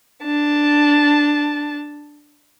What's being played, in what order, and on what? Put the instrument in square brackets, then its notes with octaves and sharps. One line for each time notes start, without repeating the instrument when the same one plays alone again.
[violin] D4 A5